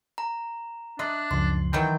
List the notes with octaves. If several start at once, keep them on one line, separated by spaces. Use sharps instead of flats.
A#5
D4 D#5 E5 C6 F#6
C#2 F#2 F3 C6
D#3 E3 F#3 G5